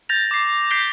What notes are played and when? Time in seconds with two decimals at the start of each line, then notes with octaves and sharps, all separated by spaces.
0.09 G6 A6 A#6 F7
0.31 D6 C7
0.70 G6 B6 C7 D7 G7